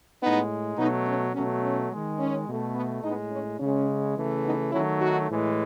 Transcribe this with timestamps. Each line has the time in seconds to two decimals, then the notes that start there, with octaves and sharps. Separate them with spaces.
0.21 A2 G#3 B3 D#4
0.77 B2 F#3 A3 B3 D#4
1.05 C#4
1.34 B2 F#3 A3 C#4
1.62 C#4
1.90 G#3
1.95 D#3
2.19 C#4
2.47 B2 A3
2.75 B3
3.03 A2 G#3 B3 D#4
3.32 C#4
3.60 C#3 G#3 C#4
4.16 C#3 E3 A3
4.45 B3 D#4
4.72 D#3 F#3 A3 C#4 E4
5.00 D#4 F#4
5.30 A2 E3 G#3